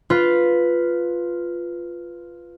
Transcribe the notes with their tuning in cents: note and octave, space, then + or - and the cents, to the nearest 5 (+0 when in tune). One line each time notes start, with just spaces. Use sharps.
F4 +0 B4 +0